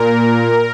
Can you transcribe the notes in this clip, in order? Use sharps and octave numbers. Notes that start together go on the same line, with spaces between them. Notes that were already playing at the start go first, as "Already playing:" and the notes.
Already playing: A#2 A#4